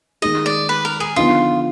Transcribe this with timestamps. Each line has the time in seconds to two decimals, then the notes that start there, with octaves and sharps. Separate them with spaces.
0.22 D#3 G#3 D#4 G#4 D#5
0.46 D5
0.69 B4
0.85 A#4
1.00 G#4
1.16 D3 F3 B3 D#4 F4